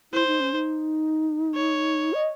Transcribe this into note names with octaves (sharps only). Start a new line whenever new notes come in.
E4 C5
D#4
C#4
D#4
C#5
D#5